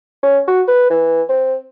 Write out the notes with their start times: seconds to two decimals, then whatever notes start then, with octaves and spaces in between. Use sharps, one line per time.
0.23 C#4
0.48 F#4
0.68 B4
0.90 E3
1.29 C4